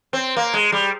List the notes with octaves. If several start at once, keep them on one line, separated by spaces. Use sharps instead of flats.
C4
A#3
G#3
G3